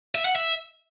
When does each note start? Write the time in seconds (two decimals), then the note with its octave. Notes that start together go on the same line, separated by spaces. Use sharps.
0.15 E5
0.25 F#5
0.36 E5